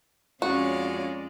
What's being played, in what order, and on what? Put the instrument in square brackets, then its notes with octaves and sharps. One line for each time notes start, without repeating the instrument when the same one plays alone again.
[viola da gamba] F2 G#3 D5 [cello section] C#4 C#5 [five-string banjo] F#4 [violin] F5 A#5